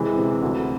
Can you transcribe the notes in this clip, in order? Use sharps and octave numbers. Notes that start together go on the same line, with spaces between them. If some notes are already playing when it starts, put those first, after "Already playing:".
Already playing: C3 E3 G#3
C3
D2